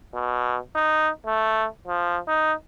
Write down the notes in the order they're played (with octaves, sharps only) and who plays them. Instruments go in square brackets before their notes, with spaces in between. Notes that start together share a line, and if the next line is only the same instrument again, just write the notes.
[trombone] B2
D#4
A3
F3
D#4